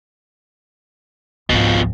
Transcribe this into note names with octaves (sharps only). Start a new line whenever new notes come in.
G#1 C#2 B2 F3